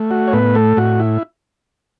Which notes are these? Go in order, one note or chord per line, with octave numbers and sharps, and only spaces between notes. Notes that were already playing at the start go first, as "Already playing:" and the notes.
Already playing: A3
F#4
C#5
A2 B3 B4
A3 A4
A2 F#4
E4